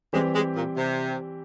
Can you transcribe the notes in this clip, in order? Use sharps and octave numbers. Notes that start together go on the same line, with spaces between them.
E3 G3 G#3 C4 G4
G#3
A#2
C3